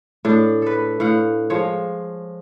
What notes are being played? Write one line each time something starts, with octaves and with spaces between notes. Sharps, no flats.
A2 D4
A4 B4
A2 F5 F#5
F3 G#3 C#5